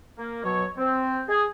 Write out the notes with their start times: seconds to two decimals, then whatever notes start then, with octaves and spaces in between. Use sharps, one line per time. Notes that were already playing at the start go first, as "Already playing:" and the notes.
0.18 A#3
0.43 B2 F#3 C#5
0.77 C4
1.28 G#4